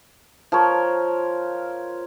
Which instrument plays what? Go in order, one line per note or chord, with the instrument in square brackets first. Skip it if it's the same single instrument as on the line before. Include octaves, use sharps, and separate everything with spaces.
[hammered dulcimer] F3 A#4 C#5